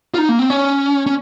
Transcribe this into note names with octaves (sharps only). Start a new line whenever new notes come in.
F4
D#4
A#3
C4
C#4
C#4